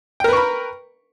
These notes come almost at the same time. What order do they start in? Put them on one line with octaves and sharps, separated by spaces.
G5 A#4 B4 C#6 B5